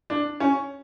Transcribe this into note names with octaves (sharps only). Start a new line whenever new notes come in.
D4
C#4